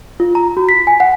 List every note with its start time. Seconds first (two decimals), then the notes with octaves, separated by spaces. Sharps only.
0.20 F4
0.35 A#5
0.57 F#4
0.69 B6
0.87 G#5
1.00 F#5